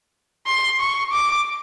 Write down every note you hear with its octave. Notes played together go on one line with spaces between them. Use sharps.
C6
C#6
D6